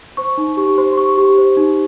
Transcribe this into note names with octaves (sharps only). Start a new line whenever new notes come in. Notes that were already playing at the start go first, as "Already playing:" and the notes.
C5 C#6
D#4
G4 C#6
C5 C6
C6
G4 C#6
G4 C#6
C5
D#4